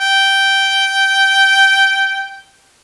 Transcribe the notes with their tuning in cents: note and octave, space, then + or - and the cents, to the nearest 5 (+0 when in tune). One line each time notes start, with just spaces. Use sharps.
G5 -10